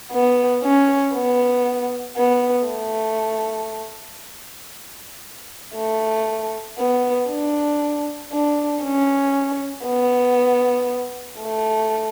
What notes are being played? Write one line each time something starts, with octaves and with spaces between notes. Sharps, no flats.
B3
C#4
B3
B3
A3
A3
B3
D4
D4
C#4
B3
A3